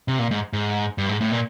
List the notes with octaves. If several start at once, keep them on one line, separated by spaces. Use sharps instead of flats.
C3
A#2
G#2
G#2
G2
G#2
A2
A#2